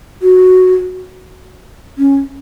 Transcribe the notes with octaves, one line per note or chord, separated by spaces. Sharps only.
F#4
C#4